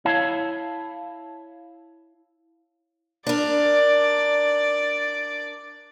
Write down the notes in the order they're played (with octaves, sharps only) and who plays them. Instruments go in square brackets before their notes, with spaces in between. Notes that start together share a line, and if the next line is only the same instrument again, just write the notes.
[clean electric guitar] E4 C#5 F5 A5
[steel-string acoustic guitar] D4 A#4 [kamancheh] D5